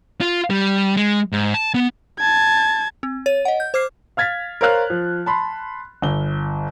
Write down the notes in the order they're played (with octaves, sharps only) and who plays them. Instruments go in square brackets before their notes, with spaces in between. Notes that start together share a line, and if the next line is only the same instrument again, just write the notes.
[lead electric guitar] F4
G3
G#3
G#2
A5
B3
[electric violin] A5 G#6
[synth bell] C4
C#5 D#7
D#5 F#5
G6
C5 D6 F6 C7
[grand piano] F5 F6 G#6 A6 B6
A#4 C5 C#5 F5 F6 F#6
F3
A5 B5 C6
G1 G7